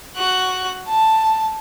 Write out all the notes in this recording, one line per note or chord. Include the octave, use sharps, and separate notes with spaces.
F#4 F#6
A5